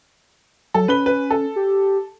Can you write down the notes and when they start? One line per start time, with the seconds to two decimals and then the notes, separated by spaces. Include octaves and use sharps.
0.74 F#3 A4
0.88 C#4 B4 B5 G7
1.06 B4
1.31 A4
1.56 G4